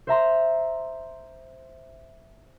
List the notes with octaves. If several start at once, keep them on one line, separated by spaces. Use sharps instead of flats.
C5 E5 A#5 C6